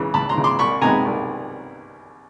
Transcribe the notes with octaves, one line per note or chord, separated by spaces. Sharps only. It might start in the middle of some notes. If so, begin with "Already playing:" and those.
Already playing: C#2 C#3 E3
C#2 A5 B5
A#5 C6
C#3 E3
C6 D6
C2 B5 C#6
C3 D#3 G#3 B3 G#5 A#5
C2